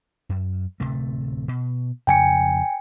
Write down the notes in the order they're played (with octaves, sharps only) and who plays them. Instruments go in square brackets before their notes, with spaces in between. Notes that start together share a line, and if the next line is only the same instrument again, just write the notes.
[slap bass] F#2
D1 C3 A3
B2
[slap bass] F2 C#3 [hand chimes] G5 G#5 C#7